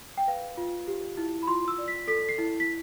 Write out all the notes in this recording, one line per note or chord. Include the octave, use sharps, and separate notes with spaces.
G5
B4 F5
F4
G4
E4
B5
F4 C6
E6
D5
B6
A4 B6
C7
E4
B6